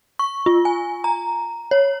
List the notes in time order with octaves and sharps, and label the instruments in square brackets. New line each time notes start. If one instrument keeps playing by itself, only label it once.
[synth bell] C#6
F4
G#5
A#5
C#5